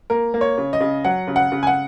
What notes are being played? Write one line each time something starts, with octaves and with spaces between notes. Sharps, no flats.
A#3 A#4
A#3
C#5
C#3
D#5
C#3
F#3 F#5
C#3
F#5
C#3
G#5
F#5